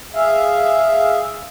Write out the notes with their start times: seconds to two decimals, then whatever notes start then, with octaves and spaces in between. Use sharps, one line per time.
0.14 G#4 E5 F5